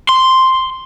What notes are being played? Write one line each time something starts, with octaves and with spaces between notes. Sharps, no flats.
C6